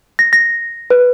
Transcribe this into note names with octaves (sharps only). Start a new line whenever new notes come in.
A#6
A#6
B4